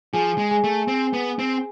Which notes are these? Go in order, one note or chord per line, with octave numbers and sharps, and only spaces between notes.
F3 G#4 G#5
G#3
G#4 G#5
A3
C4
B3
C4